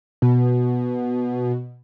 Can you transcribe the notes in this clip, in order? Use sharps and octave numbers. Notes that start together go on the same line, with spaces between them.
B2